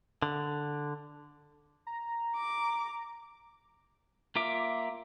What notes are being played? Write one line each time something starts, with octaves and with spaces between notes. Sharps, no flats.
D3
A#5
D6
A#3 F4 E5 D6